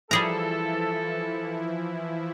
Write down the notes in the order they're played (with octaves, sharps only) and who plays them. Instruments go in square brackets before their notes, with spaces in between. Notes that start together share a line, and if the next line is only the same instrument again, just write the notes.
[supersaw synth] E3 F3 E4 [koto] G3 G#4 A#5 [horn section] A4